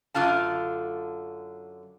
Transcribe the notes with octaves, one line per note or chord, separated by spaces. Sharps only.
F#2 D3 F4 F5 A5